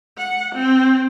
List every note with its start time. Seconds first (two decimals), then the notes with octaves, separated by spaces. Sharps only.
0.18 F#5
0.55 C4